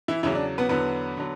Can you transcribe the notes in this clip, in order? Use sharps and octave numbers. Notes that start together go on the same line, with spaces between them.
E3 E4
E2 C#3 E3 F#3 E4
D4
B3 B4
E2 D3 F#3 B3 B4
D3 F#3